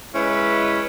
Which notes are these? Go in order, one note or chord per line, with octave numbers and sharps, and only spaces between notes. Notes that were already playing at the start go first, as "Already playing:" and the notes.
G#3 C#4 E4 B4